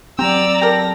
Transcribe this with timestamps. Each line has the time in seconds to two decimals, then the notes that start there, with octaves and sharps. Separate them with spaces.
0.19 F#3 C4 G4 D5 A#5 E6
0.61 G4 A4 A#4 A#6